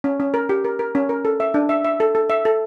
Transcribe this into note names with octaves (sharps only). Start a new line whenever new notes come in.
C#4
C#4
A#4
G4
A#4
A#4
C#4
A#4
A4
E5
D4
E5
E5
A4
A4
E5
A4